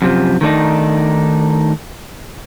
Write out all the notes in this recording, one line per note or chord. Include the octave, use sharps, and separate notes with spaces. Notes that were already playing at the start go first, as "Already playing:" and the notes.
F#2 C3 F3
D#3 A3 D4 D#4